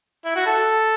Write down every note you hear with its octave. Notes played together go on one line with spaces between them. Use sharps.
E4
F#4
A4